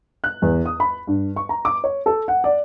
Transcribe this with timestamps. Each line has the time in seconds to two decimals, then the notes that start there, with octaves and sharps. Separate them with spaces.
0.24 F#6
0.42 E2
0.66 D#6
0.80 B5
1.07 G2
1.36 C#6
1.49 A#5
1.65 D6
1.84 C#5
2.06 A4
2.28 F#5
2.44 D5